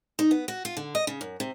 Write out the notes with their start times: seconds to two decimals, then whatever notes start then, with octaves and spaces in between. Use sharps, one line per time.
0.19 D#4
0.31 B3
0.48 F#4
0.65 F4
0.77 D3
0.95 D#5
1.07 C#3
1.21 F#2
1.40 C3